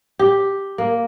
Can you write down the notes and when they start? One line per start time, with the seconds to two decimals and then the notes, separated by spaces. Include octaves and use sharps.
0.19 G4
0.78 A#3